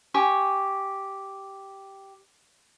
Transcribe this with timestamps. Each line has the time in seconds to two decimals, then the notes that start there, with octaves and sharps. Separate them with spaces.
0.14 G4 G#5 C#6